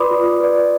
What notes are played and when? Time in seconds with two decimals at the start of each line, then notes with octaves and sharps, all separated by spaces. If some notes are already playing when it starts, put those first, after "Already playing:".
Already playing: F4 B4 D5 B5 C6 D6 D#6
0.11 F4
0.40 B4 D5